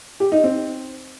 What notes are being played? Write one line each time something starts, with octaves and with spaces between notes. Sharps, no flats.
G4
D#4
C4